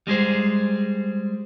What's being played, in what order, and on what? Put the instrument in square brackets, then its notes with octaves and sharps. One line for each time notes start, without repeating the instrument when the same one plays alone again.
[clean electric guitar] G3 G#3 G#4 C5